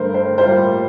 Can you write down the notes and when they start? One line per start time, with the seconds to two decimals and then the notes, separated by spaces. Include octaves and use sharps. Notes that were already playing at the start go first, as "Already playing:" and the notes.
Already playing: G2 D3 A3 A#4 C5
0.14 C5
0.38 A2 G3 A#3 F4 C5